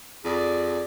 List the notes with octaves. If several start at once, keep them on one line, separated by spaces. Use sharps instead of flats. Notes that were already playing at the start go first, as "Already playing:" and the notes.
F2 G#4 D5